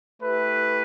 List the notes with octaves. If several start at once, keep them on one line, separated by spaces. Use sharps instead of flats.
A3 E4 G4 B4